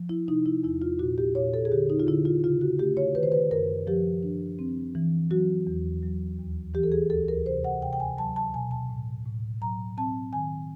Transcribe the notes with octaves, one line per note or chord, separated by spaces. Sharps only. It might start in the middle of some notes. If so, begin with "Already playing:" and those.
Already playing: F3
E4
C3 D#4
E4
E2 E4
F4
A#2 F#4
G4
A#2 C#5
A4
G#4
D3 G4
D#4
F4
D3 E4
F4
C#3 F4
F#4
A3 G4
C#5
D#3 B4
C5
B4
F#2 A#4
F3 G4
D4
C4
E3
F#3 F#4
E2
F#3
D#2
E3 G4
A4
G#4
D2 A4
A#4
C3 C5
F#5
C3 G5
G5
G#5
F#3 A5
A5
B2 G#5
A5
A2
A2
F#3 A#5
C4 A5
D#3 G#5